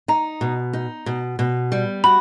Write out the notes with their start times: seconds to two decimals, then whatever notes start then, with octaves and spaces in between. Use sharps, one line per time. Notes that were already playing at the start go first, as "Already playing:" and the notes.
0.08 D#4 A#5
0.41 B2
0.73 D#4
1.06 B2
1.39 B2
1.72 G3
2.04 F#4 B5